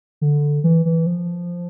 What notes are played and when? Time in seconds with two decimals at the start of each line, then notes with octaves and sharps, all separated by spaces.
0.21 D3
0.64 E3
0.85 E3
1.06 F3